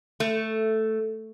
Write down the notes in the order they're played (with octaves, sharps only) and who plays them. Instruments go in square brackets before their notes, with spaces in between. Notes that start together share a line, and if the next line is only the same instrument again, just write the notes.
[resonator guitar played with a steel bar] A3